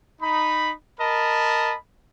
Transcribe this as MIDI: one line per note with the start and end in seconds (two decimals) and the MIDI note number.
0.21 0.73 63
0.21 0.73 83
0.99 1.75 70
0.99 1.75 75
0.99 1.75 81
0.99 1.75 83